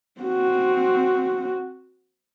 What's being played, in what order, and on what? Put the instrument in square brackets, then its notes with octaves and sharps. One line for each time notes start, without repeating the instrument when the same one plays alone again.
[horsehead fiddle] C4 F#4